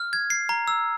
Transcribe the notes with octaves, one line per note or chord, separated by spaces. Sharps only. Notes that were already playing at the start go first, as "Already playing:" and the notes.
Already playing: F6
G#6
C7
A#5
E6